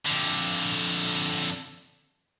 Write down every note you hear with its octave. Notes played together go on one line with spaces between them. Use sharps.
F2 D3